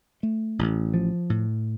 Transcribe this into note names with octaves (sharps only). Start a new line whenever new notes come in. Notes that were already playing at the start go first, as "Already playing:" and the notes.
A3
A1
F3
A2